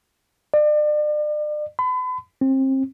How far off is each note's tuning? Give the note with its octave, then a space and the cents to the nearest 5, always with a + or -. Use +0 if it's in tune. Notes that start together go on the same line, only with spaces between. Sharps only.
D5 +40
B5 +40
C4 +30